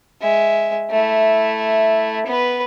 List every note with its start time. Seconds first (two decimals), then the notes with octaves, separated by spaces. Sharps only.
0.22 G#3 E5
0.91 A3 E4
2.27 B3 B4